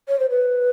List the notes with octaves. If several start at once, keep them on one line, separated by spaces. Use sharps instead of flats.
C#5
C5
B4